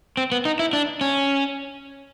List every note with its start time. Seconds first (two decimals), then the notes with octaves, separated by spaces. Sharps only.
0.17 C4
0.32 B3
0.45 D#4
0.59 E4
0.73 D4
1.01 C#4